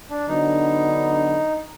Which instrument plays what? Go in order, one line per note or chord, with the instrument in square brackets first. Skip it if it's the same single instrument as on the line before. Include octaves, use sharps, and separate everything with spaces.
[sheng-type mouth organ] D4
[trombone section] D3 F#3 B3 D4 [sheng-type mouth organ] D#4